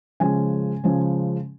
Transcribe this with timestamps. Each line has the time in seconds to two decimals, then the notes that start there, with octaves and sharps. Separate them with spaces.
0.20 C#3 F3 G#3 C#4 G#5
0.84 C#3 F3 G#3 C#4